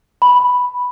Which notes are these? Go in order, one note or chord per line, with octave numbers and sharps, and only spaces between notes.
B5